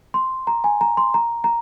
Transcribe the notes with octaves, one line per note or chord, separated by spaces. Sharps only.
C6
A#5
G#5
A#5
C6
A#5
A#5